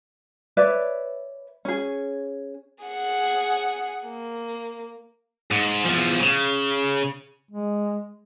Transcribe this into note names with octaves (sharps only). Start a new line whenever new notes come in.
B4 C#5 D5 E5
C#4 G#4
G#4 F#5
A#3
G#2
E2 F3
C#3
G#3